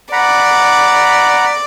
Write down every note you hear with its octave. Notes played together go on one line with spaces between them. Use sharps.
D5 F#5 A#5 B5